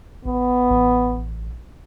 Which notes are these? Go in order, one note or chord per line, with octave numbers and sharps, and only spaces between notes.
A1 B3
A1